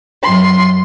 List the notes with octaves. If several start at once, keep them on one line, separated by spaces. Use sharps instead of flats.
F#2 C6